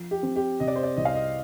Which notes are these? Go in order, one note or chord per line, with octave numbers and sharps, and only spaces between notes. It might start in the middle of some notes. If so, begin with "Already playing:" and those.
Already playing: F3
G4
C4
G4
C3 D#5
D5
C5
D5
C2 D#5
F5
D#5